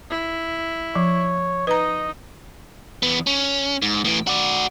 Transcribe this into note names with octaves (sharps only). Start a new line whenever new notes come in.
E4
F3 C#5
D#4 B4 D#5 A#5
E2 B3
C#4
G#2
A2 E3
F#4 D5